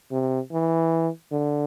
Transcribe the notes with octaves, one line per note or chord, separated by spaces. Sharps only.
C3
E3
D3